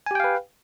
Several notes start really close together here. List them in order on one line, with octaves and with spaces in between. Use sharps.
G#5 G4 G5 F5 B4